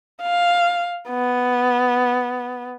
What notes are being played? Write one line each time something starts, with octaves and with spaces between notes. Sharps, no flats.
F5
B3